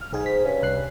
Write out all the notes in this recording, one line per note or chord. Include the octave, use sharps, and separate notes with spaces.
F6
B1 G#2 G#4 G#5
B6
G2 C#4
C2 F#6 C7